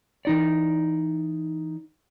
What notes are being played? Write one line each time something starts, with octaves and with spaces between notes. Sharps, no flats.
E3 D#4 D5